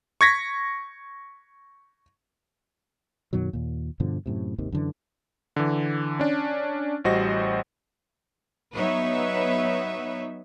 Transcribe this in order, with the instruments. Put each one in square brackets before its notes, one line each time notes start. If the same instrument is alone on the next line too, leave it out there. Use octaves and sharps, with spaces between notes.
[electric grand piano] C#6 G#6 A#6 B6
[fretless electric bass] F#2 B2 D#3 F#3
D#2 A#2
G2 B2 D3 F3
F#2 A2 C3
G#1 D#2 C3 D#3
F#2 D3 E3
[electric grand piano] D3 E3
C#4 D4
A1 G3 F#4 C5 D#5 A#6
[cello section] F#3 B3 D#4 B4 C#5 E5